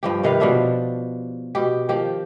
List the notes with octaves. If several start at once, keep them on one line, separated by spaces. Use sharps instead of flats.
G2 F3 G4
C3 D#3 B4 F5
B2 F3 D4 E5
B2 G4
D#3 F3 G4